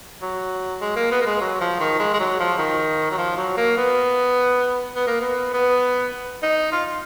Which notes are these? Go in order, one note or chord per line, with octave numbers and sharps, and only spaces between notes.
F#3
G#3
A#3
B3
A#3
G#3
F#3
F3
D#3
G#3
G#3
F#3
F3
D#3
F#3
F3
F#3
A#3
B3
B3
A#3
B3
B3
D#4
F4